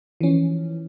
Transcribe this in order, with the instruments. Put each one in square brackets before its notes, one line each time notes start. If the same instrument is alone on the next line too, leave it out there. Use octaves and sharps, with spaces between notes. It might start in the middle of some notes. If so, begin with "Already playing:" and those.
[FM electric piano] E3 F3 C#4